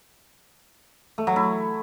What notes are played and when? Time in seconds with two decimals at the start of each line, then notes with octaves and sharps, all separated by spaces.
1.18 A3
1.27 F#3
1.36 E4